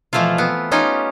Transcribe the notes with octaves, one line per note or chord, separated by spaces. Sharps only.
B2 E3 F3 A3 E4 F4
B3 C4
C#4 D#4 F4 G4 G5